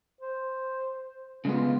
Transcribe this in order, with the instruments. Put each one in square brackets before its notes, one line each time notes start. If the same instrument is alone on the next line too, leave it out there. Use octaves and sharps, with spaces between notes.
[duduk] C5
[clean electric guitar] C#3 G#3 B3 [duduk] F4